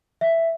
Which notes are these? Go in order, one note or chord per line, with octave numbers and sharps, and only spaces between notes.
E5